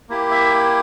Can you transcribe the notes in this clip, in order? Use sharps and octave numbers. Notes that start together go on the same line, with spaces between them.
A#3 E4 G4
E5